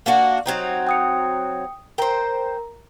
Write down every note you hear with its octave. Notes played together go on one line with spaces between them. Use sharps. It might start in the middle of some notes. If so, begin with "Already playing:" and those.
A#3 D4 F#4
F#3 C4 D#4
G5 D#6 C#7
A#4 C5 G5 A#5